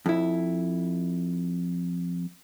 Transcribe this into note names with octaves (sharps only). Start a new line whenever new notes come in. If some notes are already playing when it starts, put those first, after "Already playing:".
F2 E4